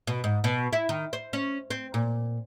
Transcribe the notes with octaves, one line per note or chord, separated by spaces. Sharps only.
B2
G#2
B2
E4
D#3
C5
C#4
C4
A#2